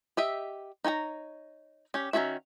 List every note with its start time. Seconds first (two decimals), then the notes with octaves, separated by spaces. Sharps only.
0.17 G4 D#5 E5
0.84 D#4 C#5 G5 A#5
1.94 C#4 G4
2.13 D#3 A3 C#4 F#4 E5